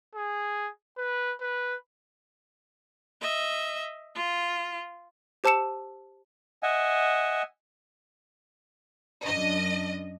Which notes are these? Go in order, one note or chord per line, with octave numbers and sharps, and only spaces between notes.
G#4
B4
B4
D#5 E5
F4
G4 C5 A5 E6 C#7 E7
D#5 E5 F#5 G#5
F#2 D4 D#5